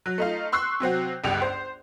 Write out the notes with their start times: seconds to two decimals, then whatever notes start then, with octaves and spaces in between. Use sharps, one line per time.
0.06 F#3
0.18 A3 D#4 F4
0.52 C6 C#6 E6 F#6 C7
0.80 C3 F#3 C4 F#4
1.24 G1 C#2 G2 G4 F7
1.42 C5